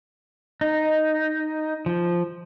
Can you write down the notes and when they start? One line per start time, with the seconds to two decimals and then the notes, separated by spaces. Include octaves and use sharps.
0.61 D#4
1.86 F3